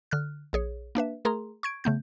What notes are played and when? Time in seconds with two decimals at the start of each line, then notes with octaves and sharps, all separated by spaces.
0.11 D3 F6 F#6
0.53 A#1 G#4 C#5
0.95 A#3 D4 B4 E5
1.25 A3 G#4 A#4 A#5 C6
1.63 C#6 G#6 D7
1.84 C#3 A3 B3 G6